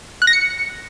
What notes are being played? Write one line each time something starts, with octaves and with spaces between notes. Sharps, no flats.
F#6
A#6
C#7